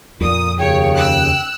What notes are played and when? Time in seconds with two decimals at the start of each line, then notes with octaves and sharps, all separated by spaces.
0.21 F2 A#2 D#6
0.58 D#2 C#3 C#5 G5
0.95 E6 F#6